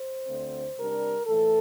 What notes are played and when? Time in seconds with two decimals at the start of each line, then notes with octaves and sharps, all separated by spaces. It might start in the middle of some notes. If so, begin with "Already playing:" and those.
Already playing: C5
0.27 D2 D3 A3 C4
0.77 C3 G3 D4 A#4
1.26 A2 E3 A3 A4